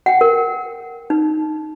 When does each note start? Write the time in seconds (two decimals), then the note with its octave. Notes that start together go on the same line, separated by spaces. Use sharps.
0.06 F#5 G5
0.21 A#4
1.10 D#4